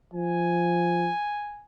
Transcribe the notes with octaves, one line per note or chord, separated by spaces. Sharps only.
F3 G#5